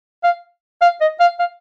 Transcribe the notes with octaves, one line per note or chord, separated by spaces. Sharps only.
F5
F5
D#5
F5
F5